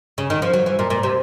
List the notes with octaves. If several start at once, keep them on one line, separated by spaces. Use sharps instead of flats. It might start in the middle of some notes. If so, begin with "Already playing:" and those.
C#3
D#3
F3
F#3
E3
A#2
A#2
C3